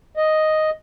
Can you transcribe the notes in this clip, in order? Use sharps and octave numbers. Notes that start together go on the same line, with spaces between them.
D#5